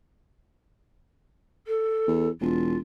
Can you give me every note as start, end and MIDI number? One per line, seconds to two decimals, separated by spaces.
1.67 2.29 69
2.08 2.30 40
2.41 2.77 28
2.41 2.78 65